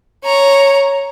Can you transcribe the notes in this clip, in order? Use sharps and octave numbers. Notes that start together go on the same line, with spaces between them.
C#5 A#5